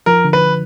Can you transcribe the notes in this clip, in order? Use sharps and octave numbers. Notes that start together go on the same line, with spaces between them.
F3 A#4
D3
B4